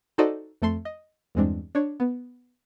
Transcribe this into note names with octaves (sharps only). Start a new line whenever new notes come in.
D#4 F#4 A4 C5 D5 D#5
F2 A3 A4 C6
D#5
E2 G2 G#3 C4 D4
D4 C#5
B3